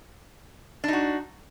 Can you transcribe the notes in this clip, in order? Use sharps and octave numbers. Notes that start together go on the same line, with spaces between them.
D4 D#4 F#4